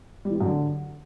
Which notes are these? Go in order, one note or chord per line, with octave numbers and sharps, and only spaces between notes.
G3
E3
G3
F#2
D3